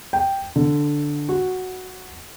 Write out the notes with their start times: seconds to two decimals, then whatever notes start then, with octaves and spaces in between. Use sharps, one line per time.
0.13 G5
0.56 D3
1.29 F#4